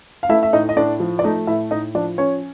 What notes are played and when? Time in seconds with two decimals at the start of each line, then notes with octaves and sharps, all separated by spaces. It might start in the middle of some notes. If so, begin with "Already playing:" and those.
0.23 F5
0.29 A3 E4 E5
0.43 E5
0.53 A2 D#4 D#5
0.69 D#5
0.77 A2 D4 D5
1.00 F3
1.19 D5
1.24 A3 D#4 D#5
1.47 A2 E4 E5
1.71 A2 D#4 D#5
1.95 F3 D4 D5
2.18 C#4 C#5